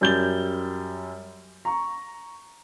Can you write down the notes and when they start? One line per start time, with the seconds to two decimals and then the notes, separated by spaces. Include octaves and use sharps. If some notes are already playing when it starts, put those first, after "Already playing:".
0.01 F#2 G3 G6 A6 G7
1.65 A#5 C#6